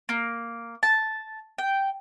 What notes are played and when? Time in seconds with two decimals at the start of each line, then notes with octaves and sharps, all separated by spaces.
0.09 A#3
0.83 A5
1.58 G5